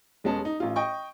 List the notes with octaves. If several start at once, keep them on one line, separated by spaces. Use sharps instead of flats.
D#1 G#3 B3 C#4 A5
D#4
A1 F4
D#5 G5 C#6